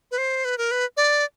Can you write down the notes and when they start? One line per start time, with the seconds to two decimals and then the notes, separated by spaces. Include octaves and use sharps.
0.11 B4
0.18 C5
0.45 B4
0.58 A#4
0.71 B4
0.97 D5